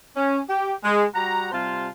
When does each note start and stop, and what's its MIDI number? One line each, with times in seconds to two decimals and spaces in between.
0.16 0.40 61
0.49 0.73 67
0.84 1.04 56
1.14 1.51 55
1.14 1.51 66
1.14 1.51 78
1.14 1.51 82
1.52 1.88 48
1.52 1.88 55
1.52 1.88 65
1.52 1.88 72
1.52 1.88 77
1.52 1.88 81